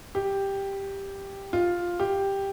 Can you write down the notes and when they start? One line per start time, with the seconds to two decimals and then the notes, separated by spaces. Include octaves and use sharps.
0.15 G4
1.53 F4
2.00 G4